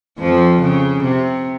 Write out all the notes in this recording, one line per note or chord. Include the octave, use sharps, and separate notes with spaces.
F2 F3
C#3
C3